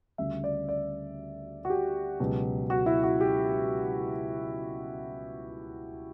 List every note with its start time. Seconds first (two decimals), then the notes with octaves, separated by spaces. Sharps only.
0.18 D2 C#3 G3 E5
0.44 D5
0.68 D5
1.65 F#4
1.70 G4
2.20 C#2 B2 F#3
2.70 F#4
2.86 E4
3.03 F#4
3.21 G4